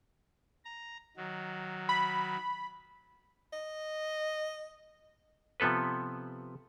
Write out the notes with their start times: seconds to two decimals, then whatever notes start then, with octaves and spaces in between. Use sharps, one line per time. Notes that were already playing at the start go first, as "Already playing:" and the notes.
0.65 A#5
1.17 D#3 F#3
1.89 B5
3.53 D#5
5.60 C3 F3 B3 A4 B4